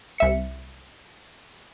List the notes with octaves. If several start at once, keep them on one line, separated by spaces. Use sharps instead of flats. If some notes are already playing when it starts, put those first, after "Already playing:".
C2 E5 C#7